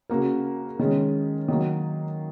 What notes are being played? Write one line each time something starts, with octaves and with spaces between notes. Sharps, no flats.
C#3 A#3 F#4 A#4
D#3 G#3 C#4
D#3 F#3 A#3